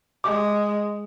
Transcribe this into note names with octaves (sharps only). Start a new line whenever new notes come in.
G#3 D6